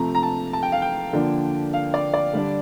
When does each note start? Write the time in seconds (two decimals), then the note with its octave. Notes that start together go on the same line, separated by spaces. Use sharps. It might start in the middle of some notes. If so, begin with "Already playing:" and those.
Already playing: C3 F3 A3 A#5
0.15 A#5
0.23 A5
0.53 A5
0.63 G5
0.72 F5
0.82 G5
1.13 D3 F3 A#3 D4
1.73 F5
1.94 D5
2.14 D5
2.33 D3 G3 D4